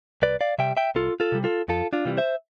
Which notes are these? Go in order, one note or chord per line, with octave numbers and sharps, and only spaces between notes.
C2 B4 D5
D5 F5
C3 G3 E5 G5
E5 G5
C2 F4 A4
F4 A4
C3 G3
F4 A4
F2 F4 A4
D4 F4
C3 E3 G3
C5 E5